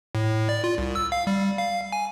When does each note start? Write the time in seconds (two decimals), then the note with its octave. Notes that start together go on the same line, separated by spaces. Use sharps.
0.15 A2
0.49 D5
0.64 F4
0.78 C2
0.95 E6
1.12 F5
1.27 G3
1.58 F5
1.92 G#5